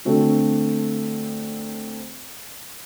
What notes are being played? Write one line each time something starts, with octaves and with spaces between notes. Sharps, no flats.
D3 A3 C4 F#4